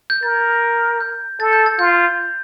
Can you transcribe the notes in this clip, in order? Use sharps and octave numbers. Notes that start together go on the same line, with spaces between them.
G6
A#4 A6
G6
A4 A6
G6
A6
F4 G6